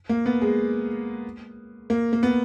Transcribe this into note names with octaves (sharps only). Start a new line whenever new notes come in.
A#3
B3
G#3
A#3
A#3
B3